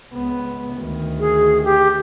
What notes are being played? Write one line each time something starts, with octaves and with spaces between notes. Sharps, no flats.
C#2 B3
D2 D#3
G#4
G4